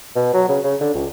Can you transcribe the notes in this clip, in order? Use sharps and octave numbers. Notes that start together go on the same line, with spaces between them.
B2
F#3
C#3
C#3
D3
C#2